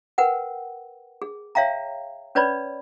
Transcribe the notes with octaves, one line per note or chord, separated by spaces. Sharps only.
A#4 B4 F#5 G5
G#4
C#5 E5 F5 G5 A#5
C#4 B4 C#5 D5 B5